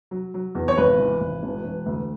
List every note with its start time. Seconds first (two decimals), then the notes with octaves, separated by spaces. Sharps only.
0.11 F#3
0.34 F#3
0.55 E2
0.68 C#5
0.78 G#1 B4
0.99 E3
1.21 G#1
1.43 E1
1.64 E1
1.86 D2